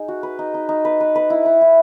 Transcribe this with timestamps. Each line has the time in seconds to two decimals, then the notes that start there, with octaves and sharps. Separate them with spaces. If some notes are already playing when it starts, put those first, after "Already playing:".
Already playing: D#4 G#4 D#5
0.08 F#4
0.23 B4
0.39 D#4
0.54 D#4
0.69 D#4
0.85 B4
1.00 B4
1.15 B4
1.30 E4
1.46 B4
1.61 E4